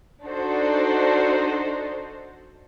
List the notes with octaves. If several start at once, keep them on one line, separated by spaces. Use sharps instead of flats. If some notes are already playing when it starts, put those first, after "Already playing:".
D4 D#4 F#4 A4 C5